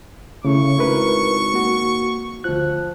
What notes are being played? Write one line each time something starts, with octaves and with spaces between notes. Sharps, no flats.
A2 C#3 C#6
G#1 E4 A#4 B4
A#3 F#4
D2 F3 F#6